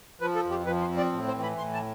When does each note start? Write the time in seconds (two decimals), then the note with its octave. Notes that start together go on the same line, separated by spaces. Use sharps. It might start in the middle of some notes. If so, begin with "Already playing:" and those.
0.20 F3 B4
0.36 A4
0.44 F2
0.51 G4
0.66 F3 B4
0.81 C5
0.89 C4
0.97 D5
1.12 A2
1.28 C5
1.35 E3
1.43 B5
1.58 A2 C6
1.74 A5